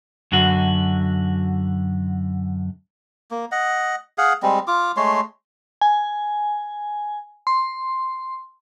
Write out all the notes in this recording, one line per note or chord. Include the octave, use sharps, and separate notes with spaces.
F#2 D3 F#4
A#3
D#5 F#5
G#4 F5 F#5
G3 G#3 C4
F4 D6
G#3 A3 C#5 C6
G#5
C6